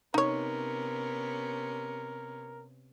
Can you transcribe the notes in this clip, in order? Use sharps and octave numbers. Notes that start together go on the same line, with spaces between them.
C3 B3 C#4 D#4 A#4 C#5